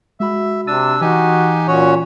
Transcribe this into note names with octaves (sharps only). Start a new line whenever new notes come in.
G#3 F#4 E5 B5
C3 D4 E6 A6 D#7
E3 D#4 F#4 G4 G#5
A#2 C#4 F#4 C#5